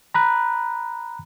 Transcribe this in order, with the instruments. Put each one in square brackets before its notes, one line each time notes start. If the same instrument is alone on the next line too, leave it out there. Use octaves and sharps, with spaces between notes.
[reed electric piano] A#5 B5 F#6